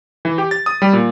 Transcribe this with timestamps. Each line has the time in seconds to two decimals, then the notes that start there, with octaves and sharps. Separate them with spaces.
0.25 E3
0.38 G4
0.51 A6
0.66 D#6
0.82 G3
0.93 A#2